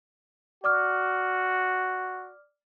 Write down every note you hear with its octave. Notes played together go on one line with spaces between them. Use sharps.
F#4 D5 D6 F6